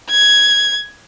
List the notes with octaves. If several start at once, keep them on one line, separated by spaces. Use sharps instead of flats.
G#6